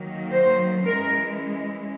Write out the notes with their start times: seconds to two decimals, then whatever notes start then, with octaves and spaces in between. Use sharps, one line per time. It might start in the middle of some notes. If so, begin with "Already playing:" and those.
Already playing: D#3 F#3 A#3
0.32 C5
0.85 E3 G#3 C#4 A#4